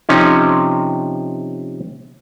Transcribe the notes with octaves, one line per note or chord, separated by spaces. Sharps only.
C3 F3 C#4 D#4